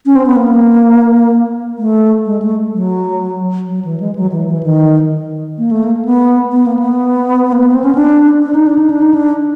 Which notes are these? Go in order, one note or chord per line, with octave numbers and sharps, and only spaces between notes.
C#4
C4
B3
A#3
A3
G#3
A3
F#3
F#3
E3
G#3
F#3
E3
E3
D#3
A#3
A3
A#3
B3
B3
A#3
B3
A#3
B3
C4
C#4
D4
D4
D#4
D4
D#4
D4
D#4
D4